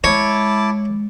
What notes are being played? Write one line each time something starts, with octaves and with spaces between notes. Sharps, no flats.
G#3 E4 C#5 A5 D6